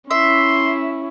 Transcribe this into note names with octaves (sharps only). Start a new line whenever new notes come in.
C#4 E4 E5 C6